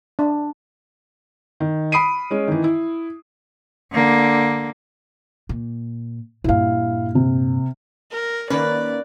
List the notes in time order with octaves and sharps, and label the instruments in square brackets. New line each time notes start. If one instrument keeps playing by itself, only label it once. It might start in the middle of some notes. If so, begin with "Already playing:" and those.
[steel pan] D4
[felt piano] D#3
B5 D#6 C7 D7 D#7
G#3 C#4
D#3 E3
E4
[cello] D3 A#3
[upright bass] A#2
[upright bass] G2 A#2 [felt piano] E4 F5
[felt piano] C3
[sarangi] A#4
[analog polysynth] D#3 A#3 C#4 [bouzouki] B4 [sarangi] D5